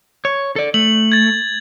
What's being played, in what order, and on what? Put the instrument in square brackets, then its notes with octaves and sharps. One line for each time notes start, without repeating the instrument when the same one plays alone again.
[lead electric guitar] C#5
A4 D5
[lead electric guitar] A3 [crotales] F#7
[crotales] G#6 A6